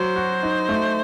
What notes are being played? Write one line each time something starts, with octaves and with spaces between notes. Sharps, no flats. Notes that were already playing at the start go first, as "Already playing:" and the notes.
Already playing: F#3 C5
F#4
D#4
A3